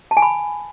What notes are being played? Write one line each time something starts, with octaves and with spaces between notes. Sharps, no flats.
A5
G#5
B5